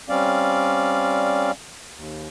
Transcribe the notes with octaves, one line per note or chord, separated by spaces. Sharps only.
G3 C4 C#4 D5 F5
D#2